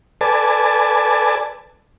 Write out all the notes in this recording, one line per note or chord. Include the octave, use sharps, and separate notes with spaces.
A4 B4 D5 G#5 A5